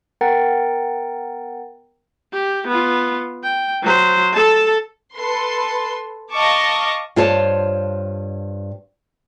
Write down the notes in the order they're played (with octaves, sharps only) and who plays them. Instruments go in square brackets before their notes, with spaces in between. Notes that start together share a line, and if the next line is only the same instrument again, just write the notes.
[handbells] B3 A#4 F#5 G5 A#5 A6
[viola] G4
B3 F4
G5
F#3 C5
A4 A5
[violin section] A4 B4 C6
D#5 F5 A5 C#6 D6
[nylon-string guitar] G2 F4 C5 C#5 A5